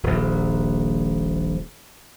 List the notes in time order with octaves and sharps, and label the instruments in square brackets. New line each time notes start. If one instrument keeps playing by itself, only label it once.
[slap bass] D#1 A#1